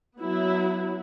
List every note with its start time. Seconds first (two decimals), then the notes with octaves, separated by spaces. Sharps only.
0.18 F#3 B3 E4